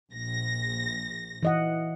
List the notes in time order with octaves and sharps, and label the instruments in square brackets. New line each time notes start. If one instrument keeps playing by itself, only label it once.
[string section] A#1 A#6
[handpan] E3 D#5 F#5